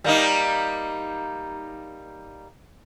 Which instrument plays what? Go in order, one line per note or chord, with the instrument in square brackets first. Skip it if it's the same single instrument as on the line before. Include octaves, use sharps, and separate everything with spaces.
[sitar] G3 A#3 D#4